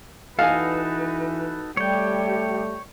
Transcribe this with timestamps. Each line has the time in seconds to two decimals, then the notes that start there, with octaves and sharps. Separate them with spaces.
0.39 E3 D#4 F#4 A4 B4 F5 G#5
1.77 G3 A3 G4 C#5 G5